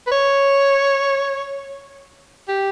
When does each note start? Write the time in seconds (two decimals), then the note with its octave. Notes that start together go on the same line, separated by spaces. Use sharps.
0.07 B4
0.11 C#5
2.48 G4